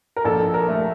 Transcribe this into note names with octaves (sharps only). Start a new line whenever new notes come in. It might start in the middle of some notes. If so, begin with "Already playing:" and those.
A#4
A#1 A4
A#4
A3